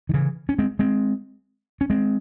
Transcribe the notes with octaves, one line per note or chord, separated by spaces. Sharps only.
D#3
C#3 E3
C#4
G#3 C4
G#3 C4
C#4
G#3 C4